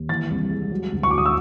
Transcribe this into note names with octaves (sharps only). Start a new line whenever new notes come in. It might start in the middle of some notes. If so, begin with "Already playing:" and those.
Already playing: D#2
E3 A6
C2
G#3
F#3
D2
C#6
D2 D6
D#6
E6